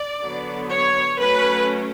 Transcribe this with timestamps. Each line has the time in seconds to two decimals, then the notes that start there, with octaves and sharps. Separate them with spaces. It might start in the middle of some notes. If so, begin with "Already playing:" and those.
Already playing: D5
0.21 D3 F#3 B3
0.69 C#5
1.19 F#3 A3 C#4 B4